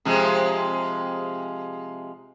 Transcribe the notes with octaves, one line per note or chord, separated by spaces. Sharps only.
C3 F3 G#3